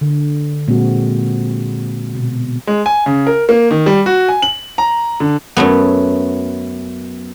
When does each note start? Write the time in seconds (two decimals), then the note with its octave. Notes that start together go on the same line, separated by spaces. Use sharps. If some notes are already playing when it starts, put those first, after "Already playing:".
0.01 D3
0.68 A#2 G#3 C4 F#4
2.15 B2
2.67 G#3
2.86 G#5
3.06 C#3
3.27 A#4
3.49 A#3
3.71 D#3
3.86 G3
4.06 F#4
4.28 G#5
4.42 F#7
4.78 A#5
5.20 D3
5.57 F#2 F#3 A3 B3